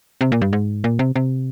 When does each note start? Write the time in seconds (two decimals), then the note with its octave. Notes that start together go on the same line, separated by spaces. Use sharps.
0.21 C3
0.32 A#2
0.41 G2
0.53 G#2
0.84 A#2
0.99 C3
1.16 C3